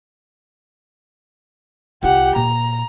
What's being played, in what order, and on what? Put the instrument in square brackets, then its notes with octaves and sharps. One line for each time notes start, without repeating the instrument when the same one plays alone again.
[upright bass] C2 F4 [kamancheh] G4 F#5
[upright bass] A#2 [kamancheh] A#5